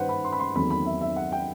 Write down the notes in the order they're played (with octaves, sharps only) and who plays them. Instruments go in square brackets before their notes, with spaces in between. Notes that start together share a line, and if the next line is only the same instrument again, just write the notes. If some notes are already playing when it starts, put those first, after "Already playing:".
Already playing: [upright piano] G2 D#3 B4 C5 F#5
B5
C6
B5
C6
E2 D#3 F#3 A3 C4 B5
B5
E5
E5
F#5
G5